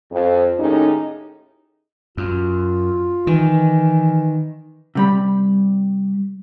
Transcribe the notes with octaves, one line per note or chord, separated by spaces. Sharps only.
F2
D#2 A2 C#4 D#4 G4 G#4
F#2 F4
D#3 E3
C3 G3 B5